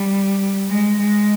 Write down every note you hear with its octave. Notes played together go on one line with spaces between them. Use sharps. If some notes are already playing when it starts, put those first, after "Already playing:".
Already playing: G3
G#3
G#3